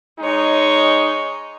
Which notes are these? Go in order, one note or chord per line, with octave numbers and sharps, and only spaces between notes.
G#3 D#4 C#5